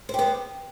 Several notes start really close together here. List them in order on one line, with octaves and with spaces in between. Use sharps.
C5 G4 B3